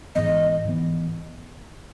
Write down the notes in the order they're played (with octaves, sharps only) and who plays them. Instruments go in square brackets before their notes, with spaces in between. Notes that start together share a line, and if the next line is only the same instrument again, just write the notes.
[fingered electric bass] G#2 E3 B3 [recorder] D#5
[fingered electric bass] G#2 E3 B3